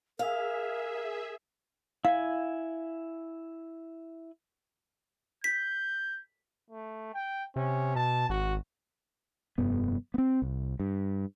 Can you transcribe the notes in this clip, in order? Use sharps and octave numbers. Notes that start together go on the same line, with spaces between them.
G#4 A#4 E5 F5
E4 F5 G#5
G6 B6
A3
G5
C3 C#4
B2 A5
G#1 F#4
F1 G2 B3
B3 C4
C2
G2